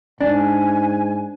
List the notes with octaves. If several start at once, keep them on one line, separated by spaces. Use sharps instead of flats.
G#2 D4 G#5